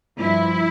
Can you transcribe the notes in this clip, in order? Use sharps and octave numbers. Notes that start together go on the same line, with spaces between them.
G2 F3 E4